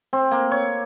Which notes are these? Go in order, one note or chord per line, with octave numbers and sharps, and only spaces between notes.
C4
A#3
C#5